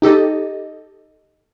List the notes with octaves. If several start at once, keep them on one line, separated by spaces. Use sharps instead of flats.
D#4 G4 A4 D#5